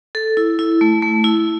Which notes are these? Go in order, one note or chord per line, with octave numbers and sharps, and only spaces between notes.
A4
E4
E4
A3
A3
E4